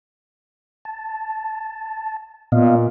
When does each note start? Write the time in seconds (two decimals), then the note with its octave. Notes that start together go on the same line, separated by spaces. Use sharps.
0.85 A5
2.52 A#2 B3 D#5 F5